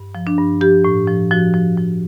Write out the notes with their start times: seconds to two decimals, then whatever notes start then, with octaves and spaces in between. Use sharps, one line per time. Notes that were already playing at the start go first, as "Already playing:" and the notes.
Already playing: G2
0.15 F3
0.27 D4
0.38 G2
0.61 F3 G4
0.84 A2
1.08 F3
1.31 F3 F#4
1.54 F3
1.78 F3